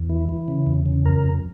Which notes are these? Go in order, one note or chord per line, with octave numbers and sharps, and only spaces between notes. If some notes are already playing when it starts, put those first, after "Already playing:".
Already playing: E2
E3
E3
C#3
E2
C#3
F2 A#4
F2